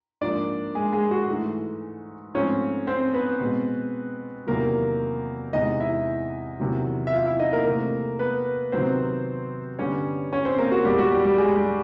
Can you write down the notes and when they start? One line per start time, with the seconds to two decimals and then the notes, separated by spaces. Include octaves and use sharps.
0.21 G#2 F3 A#3 D4 D5
0.75 G#3 G#4
0.92 G#3 G#4
1.11 F#4
1.28 G#2 E3 A3
2.34 G#2 F3 A3 C4 C#4 C#5
2.87 C4 C5
3.14 B3 B4
3.41 B2 G#3 C4
4.47 E2 C3 D#3 F#3 A#3 A#4
5.53 E2 C3 E3 G#3 D#4 D#5
5.80 E4 E5
6.60 E2 C3 D#3 F#3
7.07 E5
7.13 F4 F5
7.26 E4 E5
7.40 D#4 D#5
7.53 A#3 A#4
7.66 C3 E3 A3 A#3 C4 A#4
8.19 B3 B4
8.72 C3 D#3 F#3 B3 C4 C5
9.79 G2 D3 G3 B3 C#4 C#5
10.33 C#4 C#5
10.45 C4 C5
10.58 A#3 A#4
10.71 F#4
10.85 E2 B2 G3 G#3 G4
10.98 F#4
11.12 G3 G4
11.24 G3 G4
11.38 G#3 G#4
11.56 G3 G4